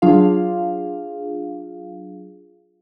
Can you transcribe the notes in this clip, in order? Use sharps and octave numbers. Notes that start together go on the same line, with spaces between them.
F#3 D4 F4 G#4 F5